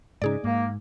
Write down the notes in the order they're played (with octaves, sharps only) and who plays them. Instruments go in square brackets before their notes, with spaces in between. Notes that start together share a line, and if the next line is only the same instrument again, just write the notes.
[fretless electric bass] G#2 C#3 [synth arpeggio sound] D#4 G#4 D5
[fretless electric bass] G#2 [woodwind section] A#3